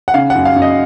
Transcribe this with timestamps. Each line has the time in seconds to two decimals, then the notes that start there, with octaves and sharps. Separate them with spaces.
0.08 F#5
0.14 C#3 F5
0.30 F#5
0.35 F#2
0.45 F5
0.56 F#2
0.62 D#5